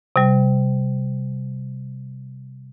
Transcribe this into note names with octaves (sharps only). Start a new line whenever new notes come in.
C3 G3